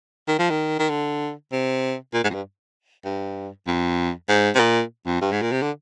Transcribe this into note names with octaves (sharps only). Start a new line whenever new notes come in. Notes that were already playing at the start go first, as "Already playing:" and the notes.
D#3
F3
D#3
D#3
D3
C3
A#2
G#2
F2
G2
G2
F2
G#2
C3
A#2
F2
G2
G#2
A#2
C3
D3